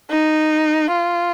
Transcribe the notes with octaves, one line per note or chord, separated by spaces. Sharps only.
D#4
F4